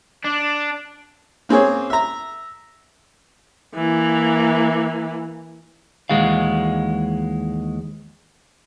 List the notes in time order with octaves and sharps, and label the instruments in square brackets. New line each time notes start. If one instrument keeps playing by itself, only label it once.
[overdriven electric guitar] D4
[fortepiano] A#3 C4 C#4 G#4 C#5
E5 A#5
[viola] E3 A#3
[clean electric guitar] D#2 E3 G#3 F#4 F5